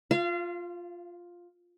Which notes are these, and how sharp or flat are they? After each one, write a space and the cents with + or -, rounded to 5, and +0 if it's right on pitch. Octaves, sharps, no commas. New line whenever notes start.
F4 +5 F5 -30